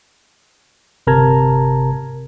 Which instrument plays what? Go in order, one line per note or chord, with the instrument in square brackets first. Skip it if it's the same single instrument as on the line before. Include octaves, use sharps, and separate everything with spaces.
[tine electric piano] G1 C3 A#4 A5 A#5 G#6